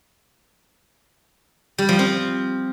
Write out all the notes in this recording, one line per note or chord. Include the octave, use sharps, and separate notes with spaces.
G3
F3
C4